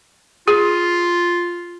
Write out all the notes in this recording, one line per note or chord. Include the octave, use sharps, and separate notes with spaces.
F4 G#4